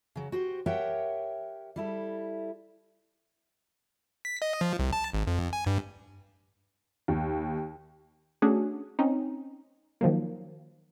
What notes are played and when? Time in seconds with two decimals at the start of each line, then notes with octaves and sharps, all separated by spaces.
0.16 C#3 F#3
0.32 F#4 G4 C5
0.66 G4 A#4 C#5 E5 F#5 G5
1.76 G3 E4 A4
4.25 B6
4.42 D#5
4.61 F3
4.79 C2
4.93 A5
5.14 G#1
5.27 F2
5.53 G#5
5.66 G2
7.08 D#2
8.42 A3 C#4 D4 F#4 G#4
8.99 C4 C#4 D#4
10.01 D#3 F3 F#3 A#3